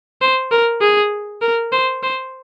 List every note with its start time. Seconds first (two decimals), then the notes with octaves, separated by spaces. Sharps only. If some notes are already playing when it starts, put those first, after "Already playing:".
0.21 C5
0.51 A#4
0.81 G#4
1.42 A#4
1.72 C5
2.03 C5